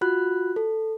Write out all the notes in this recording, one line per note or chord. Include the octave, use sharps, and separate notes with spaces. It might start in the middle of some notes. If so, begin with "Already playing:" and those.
F4 F#4 B5 F#6
A4